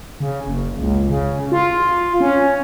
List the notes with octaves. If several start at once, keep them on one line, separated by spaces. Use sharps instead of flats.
C#3
F#1
C#2
C#3
F4
C#4